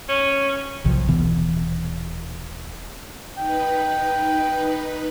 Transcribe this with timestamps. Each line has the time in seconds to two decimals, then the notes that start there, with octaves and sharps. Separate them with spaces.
0.09 C#4
0.84 F#1 B1 C3 F3
1.08 D#1 B2 E3 B3
3.38 D#4 B4 G5